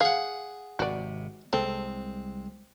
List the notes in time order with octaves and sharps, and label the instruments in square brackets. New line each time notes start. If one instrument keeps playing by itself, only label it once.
[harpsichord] G#4 F#5 [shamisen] F5
[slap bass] G#1 C3 [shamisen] F#4 D5
[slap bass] C2 G#3 [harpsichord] C4 [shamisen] A4